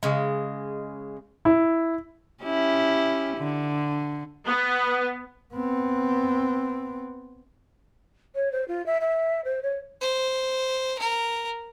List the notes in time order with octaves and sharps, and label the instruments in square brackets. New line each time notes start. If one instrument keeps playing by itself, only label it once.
[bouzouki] C#3 G#3
[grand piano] E4
[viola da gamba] C#4 E4 G4
D3
[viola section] B3
[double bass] B3 C4
[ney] C#5
C5
F4
E5
E5
C5
C#5
[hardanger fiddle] C5
A#4